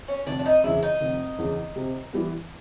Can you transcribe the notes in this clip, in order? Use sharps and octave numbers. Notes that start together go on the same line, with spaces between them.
C#4
F1 D4
D4
D#4
E2 C#3 E4
D#4
F1
E2 C#3
C3
E3 G3 B3